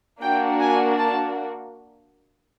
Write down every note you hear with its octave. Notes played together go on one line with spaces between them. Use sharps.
A#3 D4 F#4 G5
G#5
A5